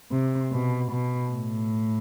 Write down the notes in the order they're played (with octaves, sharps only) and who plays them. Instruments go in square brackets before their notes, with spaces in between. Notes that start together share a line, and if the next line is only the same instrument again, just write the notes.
[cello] C3
B2
B2
A2